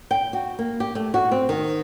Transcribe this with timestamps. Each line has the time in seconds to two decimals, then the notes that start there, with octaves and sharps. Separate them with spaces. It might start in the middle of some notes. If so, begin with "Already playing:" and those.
0.11 G5
0.33 F#4
0.59 A#3
0.80 G4
0.95 A3
1.14 F#4
1.31 C4
1.49 D#3